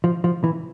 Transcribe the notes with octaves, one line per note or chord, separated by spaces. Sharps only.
F3
F3
E3